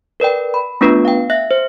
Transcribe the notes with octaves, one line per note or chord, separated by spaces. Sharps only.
A#4 B4 D5 G5
B5
A3 B3 D4 F4 B4
F5 G5
E5 F#6 A#6
C5